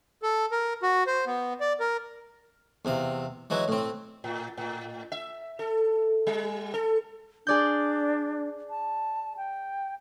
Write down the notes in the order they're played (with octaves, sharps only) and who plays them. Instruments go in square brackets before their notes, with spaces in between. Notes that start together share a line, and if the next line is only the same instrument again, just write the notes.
[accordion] A4
A#4
F#4
C5
B3
D5
A#4
[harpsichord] E2 C3 F5
E3 F#3 G#3 E4
A2 C4
[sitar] A2
A2
E5
A4
G3
A4
[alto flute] D4 [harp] G#4 D5 G6
[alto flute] A5
G5